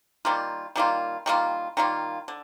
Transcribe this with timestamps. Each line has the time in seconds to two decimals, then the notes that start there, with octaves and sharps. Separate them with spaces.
0.25 D#3 G3 A#3 F4
0.76 D#3 G3 A#3 F4
1.26 D#3 G3 A#3 F4
1.77 D#3 G3 A#3 F4
2.28 D3